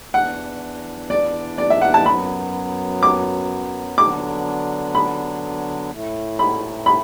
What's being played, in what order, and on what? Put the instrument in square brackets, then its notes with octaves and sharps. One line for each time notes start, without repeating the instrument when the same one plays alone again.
[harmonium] E2 E3 D4 [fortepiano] F#5
[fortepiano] D5
D5
E5
F#5
A5
[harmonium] F#2 F#3 B3 [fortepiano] B5
[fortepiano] D6
[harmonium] D3 F#3 B3 D4 [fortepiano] D6
[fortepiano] B5
[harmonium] A2 A3 E4
[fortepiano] B5
B5